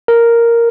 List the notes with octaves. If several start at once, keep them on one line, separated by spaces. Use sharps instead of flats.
A#4